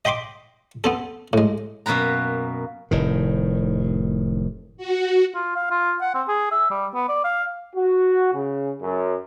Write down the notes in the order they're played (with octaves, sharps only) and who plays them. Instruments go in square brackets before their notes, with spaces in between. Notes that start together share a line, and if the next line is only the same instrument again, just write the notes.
[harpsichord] D#5 G5 B5 C6 D6
B3 C4 A4
A2 G#3
[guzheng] F#2 B2 A#3 B4 A#5
[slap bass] F1 A2 D#3
[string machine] F#4
[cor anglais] F4
F5
F4
F#5
C4
G#4
E5
G3
B3
D5
F5
[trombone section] F#4
C#3
F#2